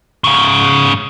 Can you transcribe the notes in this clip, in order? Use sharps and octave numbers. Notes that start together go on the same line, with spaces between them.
G#2 C#3